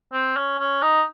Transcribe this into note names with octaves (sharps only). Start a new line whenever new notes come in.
C4
C#4
C#4
D#4